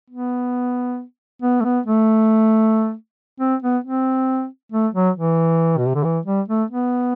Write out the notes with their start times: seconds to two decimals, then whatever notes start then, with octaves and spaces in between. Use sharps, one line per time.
0.10 B3
1.42 B3
1.60 A3
1.64 B3
1.86 A3
3.40 C4
3.62 B3
3.84 C4
4.72 A3
4.94 F#3
5.16 E3
5.78 B2
5.86 C3
5.95 D3
6.04 E3
6.26 G3
6.48 A3
6.71 B3